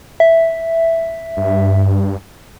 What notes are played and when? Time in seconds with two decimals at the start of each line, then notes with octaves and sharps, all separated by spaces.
0.20 E5
1.37 G2